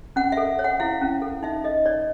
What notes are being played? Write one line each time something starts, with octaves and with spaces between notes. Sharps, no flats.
C#4 F#5
E5
A4
C#5
F#5
E4 F5
C#4
A4
D#4 E5
A4 D#5
C#5 D5